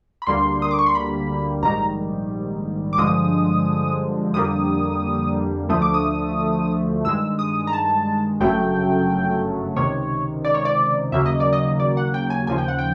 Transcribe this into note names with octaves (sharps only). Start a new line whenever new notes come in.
B5
D2 D3 G3 A#3 C6
D#6
D6
C#6
C6
B5
A#1 G#2 D#3 G3 A#5
D6
G2 D3 F3 G#3 D#6
F2 D3 G3 A#3 D#6
D2 D3 F3 A3 D#6
D6
D#6
G2 D#3 G#3 E6
D#6
A#5
A5
G1 F#2 C#3 F#3 A3 G5
C#2 C3 D#3 C#5
D5
C#5
D5
D#2 C#3 F#3 A#3 E5
D#5
D5
D#5
D5
F#5
G5
G#5
D#2 C#3 F3 G#5
G5
F#5
G5